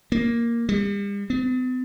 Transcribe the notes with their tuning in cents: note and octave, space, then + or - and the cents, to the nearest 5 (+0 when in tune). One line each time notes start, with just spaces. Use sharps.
A#3 +0
G3 +45
B3 +45